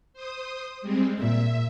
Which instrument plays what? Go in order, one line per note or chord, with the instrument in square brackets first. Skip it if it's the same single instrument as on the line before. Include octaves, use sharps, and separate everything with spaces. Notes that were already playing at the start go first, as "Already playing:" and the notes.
[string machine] C5 D#6
G3 G#3 C4
[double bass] A#2 [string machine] E5